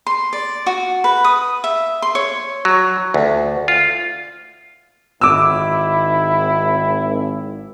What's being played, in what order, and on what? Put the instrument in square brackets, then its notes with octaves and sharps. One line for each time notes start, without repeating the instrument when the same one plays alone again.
[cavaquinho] C6
D5
F#4
B4
D#6
E5
C6
C#5
[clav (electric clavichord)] F#3
D2
F4
[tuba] G#1 [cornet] E4 [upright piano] D6 E6